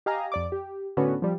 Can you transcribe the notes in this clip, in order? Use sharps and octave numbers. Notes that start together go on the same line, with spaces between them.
G4 D#5 F5 G#5 A#5
F2 D5 D6
G4
A2 D3 B3 C#4 D4 F#4
F3 G3